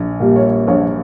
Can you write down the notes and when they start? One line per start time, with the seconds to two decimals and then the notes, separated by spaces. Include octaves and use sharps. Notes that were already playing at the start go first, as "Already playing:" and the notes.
Already playing: A#1
0.20 A#2 G3
0.36 C#5
0.67 A#1 C#5